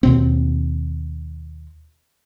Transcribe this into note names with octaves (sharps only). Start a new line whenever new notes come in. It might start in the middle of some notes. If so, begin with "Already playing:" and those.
D#2 B2 C4